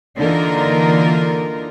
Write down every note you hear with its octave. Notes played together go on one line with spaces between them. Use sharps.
D3 E3 A#3 D#4 F4 A#4